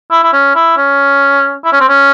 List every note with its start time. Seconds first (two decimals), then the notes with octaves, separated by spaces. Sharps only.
0.11 E4
0.23 E4
0.33 C#4
0.55 E4
0.77 C#4
1.64 E4
1.72 C#4
1.80 C4
1.89 C#4